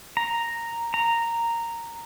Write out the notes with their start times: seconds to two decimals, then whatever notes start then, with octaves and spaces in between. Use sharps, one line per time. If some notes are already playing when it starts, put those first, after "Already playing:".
0.17 A#5
0.94 A#5